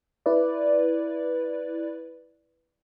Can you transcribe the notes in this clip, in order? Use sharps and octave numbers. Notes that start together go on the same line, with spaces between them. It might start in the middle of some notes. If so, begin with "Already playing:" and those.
E4 B4 D5